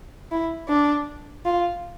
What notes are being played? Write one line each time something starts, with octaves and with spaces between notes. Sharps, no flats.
E4
D4
F4